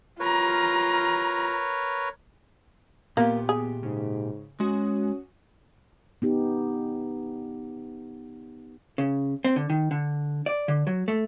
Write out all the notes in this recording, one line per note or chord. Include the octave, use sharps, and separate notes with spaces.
F4 A#4 B4 C#5 A#5
A#2 A#3 B3 G4
G#4
G#2 C#3
G#3 C#4 F#4 G#5 D#6
B3 D#4 G4
C#3
C4
D3
D#3
D3
D5
D3
F#3
A3